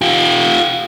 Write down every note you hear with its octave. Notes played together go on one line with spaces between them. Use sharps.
F4 G4